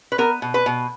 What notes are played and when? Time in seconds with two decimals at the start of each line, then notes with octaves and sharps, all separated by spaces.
0.12 B4
0.18 B3 A#4
0.42 B2
0.54 B4
0.66 B2